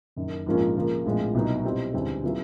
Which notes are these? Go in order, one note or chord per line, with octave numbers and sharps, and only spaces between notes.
F#1 F#2 D#3
A#1 G#2 F3 A#3 C#4
C#3 F3 A#3
A#1 A2 F3 G#3 C4
C2 B2 F#3 B3 D#4
B2 G3 C4 E4
D2 C#3 E3 G3 C4
C#3 F#3 B3 E4